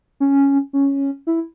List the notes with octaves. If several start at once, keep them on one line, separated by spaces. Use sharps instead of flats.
C#4
C#4
E4